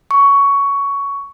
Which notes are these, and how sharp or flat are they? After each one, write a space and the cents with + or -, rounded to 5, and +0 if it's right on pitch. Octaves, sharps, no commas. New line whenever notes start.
C#6 +10